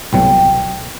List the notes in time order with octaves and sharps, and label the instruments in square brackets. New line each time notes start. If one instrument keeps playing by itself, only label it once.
[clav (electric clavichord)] C2 B2 F#3 A3 [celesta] G5